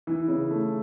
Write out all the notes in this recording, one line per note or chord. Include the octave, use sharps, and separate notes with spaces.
E3
C#3
A3